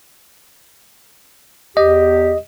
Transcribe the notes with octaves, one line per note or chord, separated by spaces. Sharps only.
E2 G4 D#5